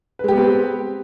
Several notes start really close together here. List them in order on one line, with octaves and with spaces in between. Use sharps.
B4 G#3 G4 B3 C4